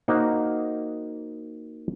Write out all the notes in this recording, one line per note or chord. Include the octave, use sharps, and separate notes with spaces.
A#3 D#4 F#4 C5